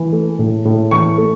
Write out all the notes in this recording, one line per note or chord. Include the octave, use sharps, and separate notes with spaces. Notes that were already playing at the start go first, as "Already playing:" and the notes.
Already playing: E3
A3
A2
A2
E3 C#6
A3